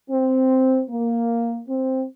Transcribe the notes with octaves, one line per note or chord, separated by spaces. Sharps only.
C4
A#3
C4